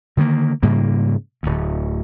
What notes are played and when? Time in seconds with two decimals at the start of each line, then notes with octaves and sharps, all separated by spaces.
0.17 D3 D#3 A3 A#3
0.63 G#2 C#3 G3 A#3
1.43 D1 D2